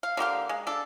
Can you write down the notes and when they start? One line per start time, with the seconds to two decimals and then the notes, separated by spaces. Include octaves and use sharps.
0.03 F5
0.17 D3 A#3 G4 F5
0.49 G#3
0.67 D4 A4